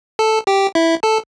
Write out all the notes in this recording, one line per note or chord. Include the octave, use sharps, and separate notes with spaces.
A4 A5
G4 G5
E4 E5
A4 A5